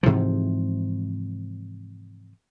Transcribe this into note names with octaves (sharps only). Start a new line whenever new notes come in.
G#2 C3 E3 F3